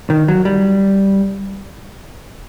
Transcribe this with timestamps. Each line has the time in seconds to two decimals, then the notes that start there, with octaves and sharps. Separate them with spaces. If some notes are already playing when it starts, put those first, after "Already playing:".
0.10 D#3
0.28 F#3
0.45 G3